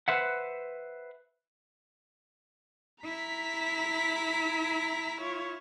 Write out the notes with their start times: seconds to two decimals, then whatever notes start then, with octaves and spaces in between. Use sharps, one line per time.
0.08 B4 C5 E5 F#5
3.04 E4 A#5 B6
5.21 F4 C#5